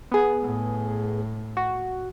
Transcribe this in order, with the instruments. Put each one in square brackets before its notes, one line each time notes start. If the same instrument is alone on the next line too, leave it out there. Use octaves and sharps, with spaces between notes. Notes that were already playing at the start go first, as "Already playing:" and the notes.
[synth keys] B3 G#4
[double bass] A2
[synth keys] F#4